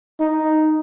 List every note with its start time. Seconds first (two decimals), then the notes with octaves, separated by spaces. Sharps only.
0.20 D#4